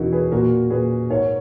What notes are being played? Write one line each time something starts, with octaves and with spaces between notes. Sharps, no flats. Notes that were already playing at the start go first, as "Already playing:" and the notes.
Already playing: E2 B2 C#4 D#4 E4 F#4 A#4
G#4 B4
A#2 F#4 A#4
A#2 G#4 B4
G#2 A#4 C#5